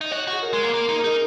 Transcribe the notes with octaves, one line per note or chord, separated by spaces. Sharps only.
D#4
D#5
F#4 C#5
F#4
G#4
A#4
G#3
A#3
A#3
D#4
A#4
D#4 G#4